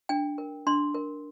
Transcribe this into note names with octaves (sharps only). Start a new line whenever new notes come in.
D4 G5
A#4
D4 C6
A#4